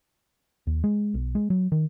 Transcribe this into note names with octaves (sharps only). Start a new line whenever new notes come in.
D#2
G#3
B1
G#3
F#3
D#3